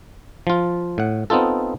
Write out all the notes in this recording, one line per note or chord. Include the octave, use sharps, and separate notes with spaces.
F3 F4
A2 F#5
B3 C4 D#4 F4 A4